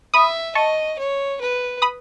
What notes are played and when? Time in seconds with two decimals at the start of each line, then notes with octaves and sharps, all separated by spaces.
0.14 E5 B5 D#6
0.55 D#5 A5 C#6
0.98 C#5
1.41 B4
1.82 B5 D#6